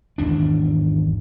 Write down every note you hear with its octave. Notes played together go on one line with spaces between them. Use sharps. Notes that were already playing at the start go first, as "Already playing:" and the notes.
G#1 E2 D4